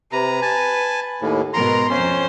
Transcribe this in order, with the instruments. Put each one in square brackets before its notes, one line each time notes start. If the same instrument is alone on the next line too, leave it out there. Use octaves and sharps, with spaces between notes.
[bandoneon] C3 A#5 [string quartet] B4
[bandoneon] G#5 A5
D#2 A2
[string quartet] G#2 B2 A#4 [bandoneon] A#5 C6
[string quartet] F2 C5 C6 [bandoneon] C#4